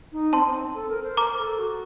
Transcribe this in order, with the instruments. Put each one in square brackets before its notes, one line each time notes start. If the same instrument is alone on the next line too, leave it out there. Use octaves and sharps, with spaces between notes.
[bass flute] D#4
[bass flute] C4 [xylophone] A5 C6
[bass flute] C4
A4
A#4
C5
[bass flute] A#4 [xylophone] A#5 D6
[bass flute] A#4
A4
F#4